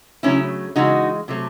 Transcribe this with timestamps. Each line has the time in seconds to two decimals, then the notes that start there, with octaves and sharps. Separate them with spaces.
0.23 C#3 F#3 A3 C#4 E4
0.76 C#3 E3 G#3 D#4 F#4
1.28 C3 F#3 A3